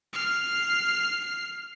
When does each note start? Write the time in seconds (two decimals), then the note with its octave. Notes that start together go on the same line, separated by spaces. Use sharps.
0.13 F6 C7